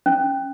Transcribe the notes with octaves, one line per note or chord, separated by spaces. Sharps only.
C#4